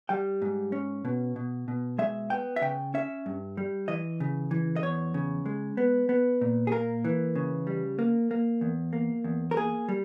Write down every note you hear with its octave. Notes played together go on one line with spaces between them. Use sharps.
G3 G5
G#2
C#4
B2
B2
B2
G#3 E5
B3 G5
E5
C#3 G5
C#4 E5
G2
G3
E3 D#5
C#3
E3
D#5
E2 C#5
C#3
G#3
B3
B3
A#2
G#4
A#3 A#4
E3
C#3
G3
A#3
A#3
E2
A#3
E2
A#4
A#3 G#4
G3